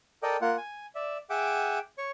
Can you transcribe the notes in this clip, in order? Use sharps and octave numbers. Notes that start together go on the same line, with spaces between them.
A4 A#4 D5 D#5 G5
A#3 F4 F#5
G#5
D5 E5
G#4 E5 F#5 G5 D6
C#5 C#6